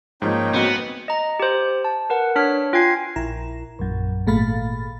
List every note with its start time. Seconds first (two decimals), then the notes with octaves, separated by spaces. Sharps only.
0.22 G#2 F3 A#3 C#4 D#4 G5
0.54 B3 C4 F#4 D#5
1.08 D#5 A#5
1.40 G4 C5
1.84 A5
2.10 A#4 B4 F#5
2.36 D4 C#5 F6 B6
2.73 F4 G5 G#5 G#6 C7
3.16 A#1 E4 A#5
3.79 A#1 F#2
4.27 G#1 A#2 A3 F5 B5 A6